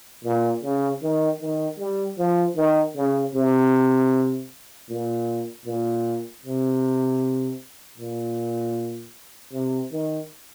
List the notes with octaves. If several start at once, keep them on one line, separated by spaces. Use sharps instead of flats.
A#2
C#3
D#3
D#3
G3
F3
D#3
C#3
C3
A#2
A#2
C3
A#2
C3
D#3